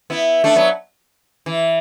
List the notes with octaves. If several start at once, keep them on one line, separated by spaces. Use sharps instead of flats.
B3 E4
A3 D4
F#3 B3
E3